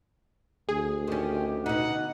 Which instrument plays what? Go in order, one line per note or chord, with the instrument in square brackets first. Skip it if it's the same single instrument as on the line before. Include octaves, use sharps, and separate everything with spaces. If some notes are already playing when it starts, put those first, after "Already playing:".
[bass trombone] D2 [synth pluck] G#4
[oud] D#3 C#4 [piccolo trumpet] G4
[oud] B2 D#4 [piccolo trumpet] F#5